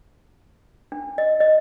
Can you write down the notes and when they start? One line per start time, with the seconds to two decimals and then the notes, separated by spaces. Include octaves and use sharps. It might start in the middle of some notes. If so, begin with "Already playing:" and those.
0.92 D4
1.18 D#5
1.40 D#5